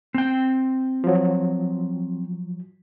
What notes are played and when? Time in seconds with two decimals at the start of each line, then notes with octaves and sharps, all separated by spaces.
0.14 C4 G5
1.04 F3 F#3